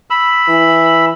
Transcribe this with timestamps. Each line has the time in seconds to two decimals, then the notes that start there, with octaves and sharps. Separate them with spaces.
0.10 B5 E6
0.49 E3